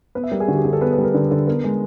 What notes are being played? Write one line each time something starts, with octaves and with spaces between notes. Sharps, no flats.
B3 B4
E5
G3 A#4
G#4
D3 F#4
G4
D3 G#4
A4
B3 B4
B4
G3
A#4
D3 A#4
D3 A4
B3 A#4
G#3